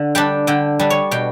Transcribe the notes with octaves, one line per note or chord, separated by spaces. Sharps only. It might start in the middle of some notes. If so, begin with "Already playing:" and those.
Already playing: D3
G3 D4 G5
D3 G5
G3 D4
C#5
B2 G5